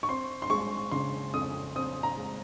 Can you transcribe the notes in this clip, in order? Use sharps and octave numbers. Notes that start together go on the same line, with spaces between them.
C#6
C4 C6
C6
G#3 C#6
C#3 C6
F2 D#6
C4 D#6
A#5
G#3